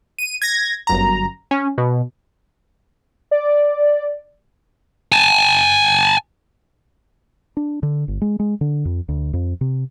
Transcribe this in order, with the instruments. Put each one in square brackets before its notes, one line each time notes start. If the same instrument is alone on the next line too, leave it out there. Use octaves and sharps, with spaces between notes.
[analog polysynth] D#7
G#6 A#6
G1 F#2 A#5
C#4
B2
[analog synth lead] D5
[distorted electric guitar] G#5 A5
[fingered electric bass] D4
D3
G1
G#3
G#3
D3
F2
D2
F2
C3